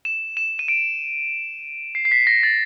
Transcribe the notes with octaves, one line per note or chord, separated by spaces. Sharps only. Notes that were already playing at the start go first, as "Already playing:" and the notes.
E7
E7
D#7
D7
C7
C7
B6
A#6
A6